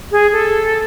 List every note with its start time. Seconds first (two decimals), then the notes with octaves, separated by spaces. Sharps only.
0.12 G#4
0.33 A4